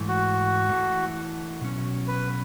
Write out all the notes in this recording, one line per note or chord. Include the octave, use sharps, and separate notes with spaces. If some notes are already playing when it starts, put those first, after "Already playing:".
Already playing: G#2 E3 A3
F#4
E3 A3 E4 A4
B2 F#3 C#4
B4